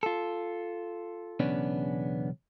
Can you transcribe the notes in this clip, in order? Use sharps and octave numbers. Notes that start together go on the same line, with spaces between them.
F4 A4
B1 E2 C#3 B3 C#4 D4